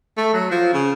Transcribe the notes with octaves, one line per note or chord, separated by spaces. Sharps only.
A3
F#3
F3
C#3